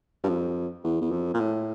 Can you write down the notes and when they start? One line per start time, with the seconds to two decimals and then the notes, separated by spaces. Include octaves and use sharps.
0.24 G2
0.28 F2
0.84 E2
1.02 E2
1.11 F2
1.34 A#2
1.40 A2